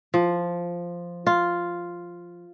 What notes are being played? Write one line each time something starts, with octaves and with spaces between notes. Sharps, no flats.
F3
F4